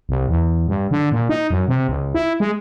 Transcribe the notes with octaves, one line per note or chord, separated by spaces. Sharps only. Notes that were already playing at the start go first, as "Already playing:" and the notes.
C2
E2
G2
D3
A#2
D#4
F#2
C3
C#2
E4
G#3